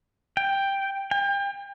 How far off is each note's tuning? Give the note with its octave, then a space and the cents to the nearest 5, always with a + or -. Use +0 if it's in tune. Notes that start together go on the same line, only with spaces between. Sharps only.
G5 +5
G5 +35